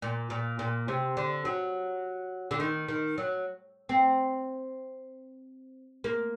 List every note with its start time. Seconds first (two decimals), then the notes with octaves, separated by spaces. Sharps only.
0.02 A#2
0.30 A#2
0.59 A#2
0.88 C3
1.17 D3
1.45 F#3
2.51 D3
2.60 D#3
2.88 D#3
3.18 F#3
3.89 C4
6.04 A#3